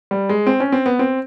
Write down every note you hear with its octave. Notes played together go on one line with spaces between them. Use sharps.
G3
G#3
C4
C#4
C4
B3
C4